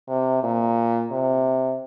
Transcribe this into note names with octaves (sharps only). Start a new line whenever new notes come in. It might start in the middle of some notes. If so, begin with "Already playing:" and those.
C3
A#2
C3